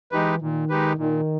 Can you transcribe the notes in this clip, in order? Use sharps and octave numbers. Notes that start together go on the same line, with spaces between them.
E3 G#3 D#4 G4 B4
A#2 D#3
G#3 D#4 G4 B4
A#2 D#3